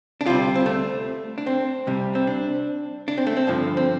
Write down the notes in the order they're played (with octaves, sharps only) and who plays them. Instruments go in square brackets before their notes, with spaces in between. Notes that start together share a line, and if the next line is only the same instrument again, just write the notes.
[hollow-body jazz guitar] D4
D2 C3 G3 F4
C4
A3
D4
C4
C2 C3 G3
C4
D4
D4
C4
A3
C4
G2 D3 F3
C4